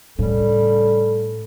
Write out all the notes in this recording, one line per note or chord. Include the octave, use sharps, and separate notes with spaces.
A2 C#3 G3 A4